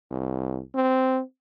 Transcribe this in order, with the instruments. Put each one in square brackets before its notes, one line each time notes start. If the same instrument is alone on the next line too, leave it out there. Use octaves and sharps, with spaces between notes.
[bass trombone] C2
C4